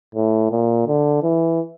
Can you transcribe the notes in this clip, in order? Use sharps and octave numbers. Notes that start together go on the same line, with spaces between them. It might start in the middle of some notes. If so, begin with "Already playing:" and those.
A2
A#2
D3
E3